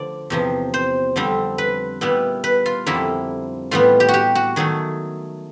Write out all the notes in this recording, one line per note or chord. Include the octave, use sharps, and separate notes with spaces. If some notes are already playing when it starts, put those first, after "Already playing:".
Already playing: D3 F3 D5
E2 C3 F3
C5
F2 D3 G3 C4
B4
A#2 G3 B3 E4
B4
F4
F2 D3 G3 A#3 E4
A2 E3 G3 B3 F4
G4
F#4
G4
F#4
D#3 F#3 A3 G#4